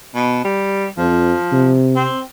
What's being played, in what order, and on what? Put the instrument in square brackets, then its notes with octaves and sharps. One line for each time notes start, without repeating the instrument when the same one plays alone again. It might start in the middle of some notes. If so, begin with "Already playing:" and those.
[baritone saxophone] B2
G3
[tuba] F2 [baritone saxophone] F3
[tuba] C3
[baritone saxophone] C4